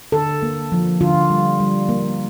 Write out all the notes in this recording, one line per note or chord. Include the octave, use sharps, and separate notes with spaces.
D3 A4
A#3
F3
D3 F4
G3
G3
A#3